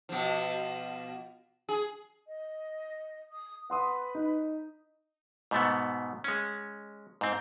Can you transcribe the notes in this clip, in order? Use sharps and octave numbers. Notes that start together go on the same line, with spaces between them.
B2 F3
G#4
D#5
D#6
B4 F#5 C6 D#6
D#4
G#2 B2 A3 B3
G#3 C#4
G#2 C4